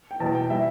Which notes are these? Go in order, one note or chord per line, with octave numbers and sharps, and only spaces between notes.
G5
E2 B2 F#3 A5
G5
E3 G3 E5